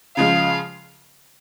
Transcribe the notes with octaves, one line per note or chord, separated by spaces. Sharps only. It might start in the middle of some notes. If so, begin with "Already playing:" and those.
C#3 F3 G#3 F5